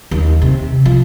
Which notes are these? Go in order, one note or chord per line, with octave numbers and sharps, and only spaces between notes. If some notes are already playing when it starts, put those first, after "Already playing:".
D#2
C3
F3